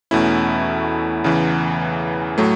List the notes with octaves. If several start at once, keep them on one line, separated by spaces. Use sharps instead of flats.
E2 B2 A3 C#4 E4
E2 C#3 E3
A2 F#3 A3